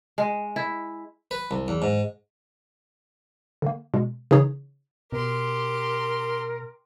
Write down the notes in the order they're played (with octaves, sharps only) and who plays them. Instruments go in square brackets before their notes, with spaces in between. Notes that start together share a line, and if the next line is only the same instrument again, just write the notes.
[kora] G#3
E4
[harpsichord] B4
C2
E2
G#2
[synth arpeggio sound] D3 A#3
B2 G#3
C#3 E3 D#4 G#4 C#5
[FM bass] B2 [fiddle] G4 C6 [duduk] A#4